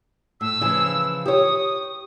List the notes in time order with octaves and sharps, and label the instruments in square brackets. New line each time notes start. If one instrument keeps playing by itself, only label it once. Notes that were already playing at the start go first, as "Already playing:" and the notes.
[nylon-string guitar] A2 [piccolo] E6
[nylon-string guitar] C#3 E3 F3
[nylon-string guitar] G4 C#5 [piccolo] D#6